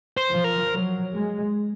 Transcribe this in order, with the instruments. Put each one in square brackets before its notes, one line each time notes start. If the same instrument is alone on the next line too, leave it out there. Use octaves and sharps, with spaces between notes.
[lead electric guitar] C5
[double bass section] F3
[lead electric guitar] A#4
[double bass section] F#3
G#3